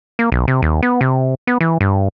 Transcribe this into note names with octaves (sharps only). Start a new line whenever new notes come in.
A#3
B1
C3
D#2
B3
C3
B3
E3
G2